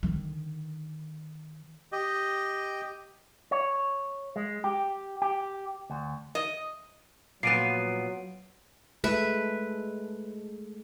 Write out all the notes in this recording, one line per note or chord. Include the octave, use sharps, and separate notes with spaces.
D3 D#3
G4 D#5
C#5
G#3
G4
G4
D2
D#5
A#2 F3 F#3 B3 C7 D7 D#7
G#3 A3 A4 B4 E5